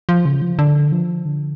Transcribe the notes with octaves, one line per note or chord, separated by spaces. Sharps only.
F3
C#3
F3
D3
F3
D3